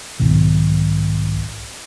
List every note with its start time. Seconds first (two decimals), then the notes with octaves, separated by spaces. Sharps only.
0.20 B1 G#2 B2 D#3